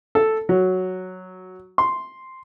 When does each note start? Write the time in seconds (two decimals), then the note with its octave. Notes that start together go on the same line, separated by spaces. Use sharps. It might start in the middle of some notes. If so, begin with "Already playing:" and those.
0.15 A4
0.49 F#3
1.78 C6